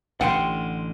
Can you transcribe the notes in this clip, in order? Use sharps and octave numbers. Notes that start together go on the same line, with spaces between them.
A1 D3 F#5 G5 C6